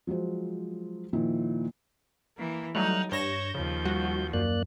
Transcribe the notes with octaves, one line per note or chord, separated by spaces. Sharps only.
F3 F#3 G#3 C5
A#2 D#3 F3 E4
E3 A#3
F#3 G3 A3 D#4 F6 F#6
G2 C#5 G6 A#6 E7
D#2 C#3 F3
G3 F#4
F#2 A#3 D5 F#6